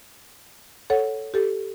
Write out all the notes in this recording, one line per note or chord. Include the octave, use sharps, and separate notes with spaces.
A4 C#5 F#5
G4 A4